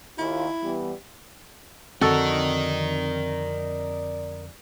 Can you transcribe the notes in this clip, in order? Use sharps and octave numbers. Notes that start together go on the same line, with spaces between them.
D#2 E4 F4
E3 G3 B3
F2 D3 C4 F#4 A4 A#4 D5 D#5